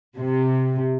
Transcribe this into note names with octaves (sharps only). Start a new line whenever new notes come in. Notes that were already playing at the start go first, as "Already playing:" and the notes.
C3